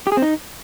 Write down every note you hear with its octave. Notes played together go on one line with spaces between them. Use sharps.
G4
G#4
C4
D#4